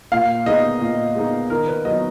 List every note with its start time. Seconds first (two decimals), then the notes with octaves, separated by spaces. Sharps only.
0.12 A#2 F5
0.46 G#3 B3 D#4 D#5
0.81 A#2
1.15 G#3 B3 D#4
1.50 D#3 A#4
1.68 B4
1.85 F#3 B3 D#4 D#5